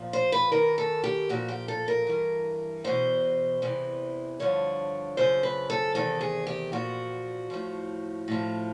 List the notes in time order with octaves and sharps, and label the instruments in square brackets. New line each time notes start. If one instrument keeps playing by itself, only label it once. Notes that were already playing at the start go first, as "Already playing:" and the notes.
Already playing: [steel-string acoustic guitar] A#2 F3
C5
B4
F#2 D#3 A#4
A4
G4
A#2 F3 F#4
G4
A4
A#4
G2 E3
E2 B2 C5
E2 C3 E3
G2 D3 F3 C#5
F#2 C#3 F3 C5
B4
A4
E2 C3 D#3 A4
G#4
G4
A#2 F3 F#4
A2 F3
A2 F3